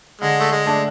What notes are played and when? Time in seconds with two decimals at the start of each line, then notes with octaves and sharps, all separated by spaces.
0.21 D3 G#3
0.40 A3
0.52 G#3
0.66 A3 D4